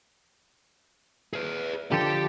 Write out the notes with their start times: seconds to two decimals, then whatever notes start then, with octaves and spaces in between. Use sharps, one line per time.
1.33 G#4 B4
1.92 D3 F3 G4 A4 G5